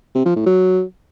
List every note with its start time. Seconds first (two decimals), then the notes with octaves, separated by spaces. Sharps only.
0.15 C3
0.25 F3
0.36 A2
0.46 F#3